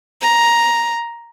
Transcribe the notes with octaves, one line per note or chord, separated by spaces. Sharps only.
A#5